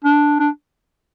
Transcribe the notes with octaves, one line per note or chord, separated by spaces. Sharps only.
D4
D4